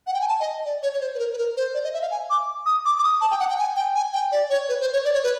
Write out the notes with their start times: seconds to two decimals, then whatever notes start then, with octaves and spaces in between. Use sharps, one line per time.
0.07 F#5
0.14 G5
0.21 G#5
0.28 A5
0.40 D#5
0.65 D5
0.83 C#5
0.94 C#5
1.01 C5
1.15 B4
1.19 A#4
1.33 B4
1.38 A#4
1.57 C5
1.74 D5
1.84 D#5
1.94 E5
2.02 F5
2.11 G#5
2.30 D6
2.66 D#6
2.85 D6
2.99 D6
3.04 D#6
3.21 A5
3.31 G5
3.40 F#5
3.49 G5
3.59 G#5
3.76 G5
3.95 G#5
4.13 G5
4.32 D5
4.50 C#5
4.69 B4
4.81 C5
4.93 C#5
5.05 D5
5.14 C#5
5.24 B4